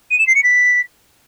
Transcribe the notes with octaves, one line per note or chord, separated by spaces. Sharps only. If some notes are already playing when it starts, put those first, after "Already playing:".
D#7
E7
C7
C#7
B6